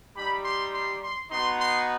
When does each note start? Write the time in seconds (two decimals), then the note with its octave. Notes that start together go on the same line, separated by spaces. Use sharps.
0.16 G3 D#4 G4 B5
0.45 C6
0.73 C6
1.02 C6
1.31 B3 D#4 F#4 C6
1.59 C6